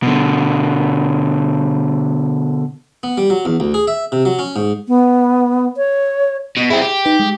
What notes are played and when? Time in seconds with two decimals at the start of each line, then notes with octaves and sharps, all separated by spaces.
0.03 B2 D3
3.03 B3
3.18 G3
3.30 F#3
3.45 E2
3.60 D2
3.74 G#4
3.87 E5
4.12 C3
4.25 F#3
4.39 C#4
4.56 G#2
4.88 B3
5.77 C#5
6.57 B2
6.70 C4 E4 G#4 G5
6.81 G4
7.05 D#4 B4
7.19 G#3